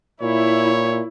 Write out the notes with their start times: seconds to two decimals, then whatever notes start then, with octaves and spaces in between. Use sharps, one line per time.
0.22 A#2 E4 C#5